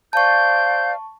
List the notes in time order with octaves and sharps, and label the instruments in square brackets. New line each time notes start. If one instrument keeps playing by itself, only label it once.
[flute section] C5 D5 F5 [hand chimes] A5 C#6 [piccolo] G6